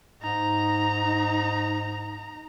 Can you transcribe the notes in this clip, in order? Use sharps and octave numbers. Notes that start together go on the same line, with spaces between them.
G#2 D#4 A#5